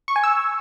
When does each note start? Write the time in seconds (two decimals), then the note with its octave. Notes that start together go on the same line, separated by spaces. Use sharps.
0.08 C#6
0.16 G#5
0.24 E6